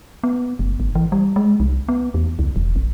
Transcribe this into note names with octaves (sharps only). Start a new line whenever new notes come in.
B3
F#1
G#1
E3
G3
G#3
C2
B3
E2
C#2
E1
A1